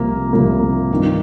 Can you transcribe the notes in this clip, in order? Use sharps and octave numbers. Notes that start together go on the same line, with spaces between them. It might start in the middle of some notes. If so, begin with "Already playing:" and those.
Already playing: C2 C3 F3 A#3
C2 C3 F3 A#3
G2 D#3